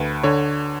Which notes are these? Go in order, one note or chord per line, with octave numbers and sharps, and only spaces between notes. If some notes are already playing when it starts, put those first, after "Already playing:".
Already playing: D2 B4
D3 C#5